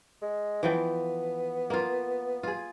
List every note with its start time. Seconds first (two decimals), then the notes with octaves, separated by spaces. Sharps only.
0.22 G#3
0.63 E3 F3 B3 G5
1.70 A#3 F4
2.43 F4 G#4